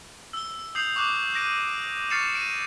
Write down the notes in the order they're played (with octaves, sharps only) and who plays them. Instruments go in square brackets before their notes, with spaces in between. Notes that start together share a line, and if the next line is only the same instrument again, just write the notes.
[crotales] E6 G7
D#6 G6 C7 F7
C#6 D6 F#6
F#6 A#6 D7 D#7
C#6 F6 A6 C7 C#7 E7
D7 D#7